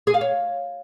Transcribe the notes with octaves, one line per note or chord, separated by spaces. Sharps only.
G#4
F5
C#5